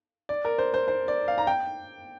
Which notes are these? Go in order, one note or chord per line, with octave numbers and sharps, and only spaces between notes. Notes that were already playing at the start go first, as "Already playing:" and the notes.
D5
A#4
C5
C5
C5
D5
F5
A#5
G5